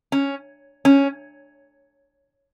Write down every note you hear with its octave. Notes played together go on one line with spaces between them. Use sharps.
C#4
C#4